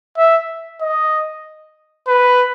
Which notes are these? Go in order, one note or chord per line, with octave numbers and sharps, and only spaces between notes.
E5
D#5
B4